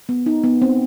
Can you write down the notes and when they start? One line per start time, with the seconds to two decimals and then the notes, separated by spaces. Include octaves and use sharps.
0.09 B3
0.26 D#4
0.43 B3
0.62 C4